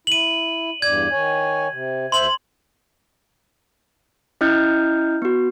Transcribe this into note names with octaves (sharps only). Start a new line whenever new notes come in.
E4 D#7 F#7
E2 G2 D5 G#6
D#3 C#5 G#5
C3
D2 C5 E5 C6 F#7
C#4 E4 D#5 F6 G6
B3 F#4